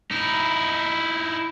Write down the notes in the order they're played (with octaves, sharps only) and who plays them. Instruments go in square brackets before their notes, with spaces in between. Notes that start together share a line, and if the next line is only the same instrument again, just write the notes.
[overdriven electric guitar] D#4 E4